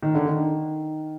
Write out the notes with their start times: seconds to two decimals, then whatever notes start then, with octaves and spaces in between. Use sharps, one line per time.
0.03 D#3
0.15 D3
0.26 D#3